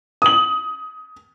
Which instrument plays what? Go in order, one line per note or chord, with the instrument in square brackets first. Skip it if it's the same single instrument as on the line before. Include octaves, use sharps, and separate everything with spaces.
[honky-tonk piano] D#6 F#7